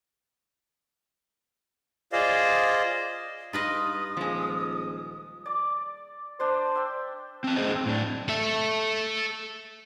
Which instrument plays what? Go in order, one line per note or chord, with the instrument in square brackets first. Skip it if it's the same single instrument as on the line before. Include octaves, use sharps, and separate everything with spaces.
[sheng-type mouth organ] F4 G#4 C5 D5 D#5 F5
[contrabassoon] G2 [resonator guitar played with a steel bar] D#4 [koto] F4 B4 D#5 [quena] D#6
[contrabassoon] D#1 [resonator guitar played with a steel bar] F3 G#3
[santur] D5 D6
[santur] D4 D5 C6 [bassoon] C5
[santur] E5 G5
[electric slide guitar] C4 A5
A3 C#4 E4 G#4 C5 D#5
C4
A2 D4
[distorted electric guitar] A4 E5